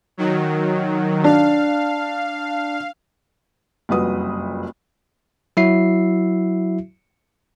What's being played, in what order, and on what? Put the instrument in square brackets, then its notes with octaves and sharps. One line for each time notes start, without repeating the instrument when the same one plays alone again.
[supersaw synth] D#3 F#3
[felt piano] D4 [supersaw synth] F5
[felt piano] F#1 C2 F2 F#4 B4 D#6
[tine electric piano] F#3 E4 F#4 E5 C7